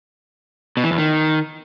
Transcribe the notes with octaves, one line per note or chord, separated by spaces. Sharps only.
B2
E3
E2
D#3